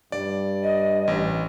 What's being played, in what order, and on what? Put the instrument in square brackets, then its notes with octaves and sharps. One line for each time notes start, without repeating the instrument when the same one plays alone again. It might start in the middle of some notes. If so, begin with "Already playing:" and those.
[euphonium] G2 [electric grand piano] D5
[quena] D#5
[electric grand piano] A1